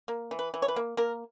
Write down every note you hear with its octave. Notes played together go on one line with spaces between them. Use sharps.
A#3
E3
B4
E3
C#5
B4
A#3
A#3 A#4